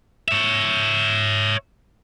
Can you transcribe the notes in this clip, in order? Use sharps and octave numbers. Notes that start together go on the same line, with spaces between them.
C#5 E5